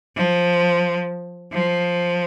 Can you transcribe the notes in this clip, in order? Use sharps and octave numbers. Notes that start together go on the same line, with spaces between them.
F3
F3